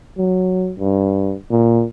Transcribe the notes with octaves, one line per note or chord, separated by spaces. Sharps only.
F#3
G2
A#2